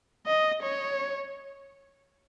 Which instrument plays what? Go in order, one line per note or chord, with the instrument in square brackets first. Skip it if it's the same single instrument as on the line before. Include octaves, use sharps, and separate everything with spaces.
[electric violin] D#5
C#5